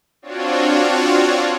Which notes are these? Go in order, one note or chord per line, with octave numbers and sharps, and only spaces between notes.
C4 D4 F4 F#4 C#5